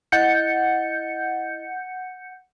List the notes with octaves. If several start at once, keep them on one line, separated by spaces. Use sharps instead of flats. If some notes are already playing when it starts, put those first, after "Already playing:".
E4 D#5 F#5 G6 A6 C#7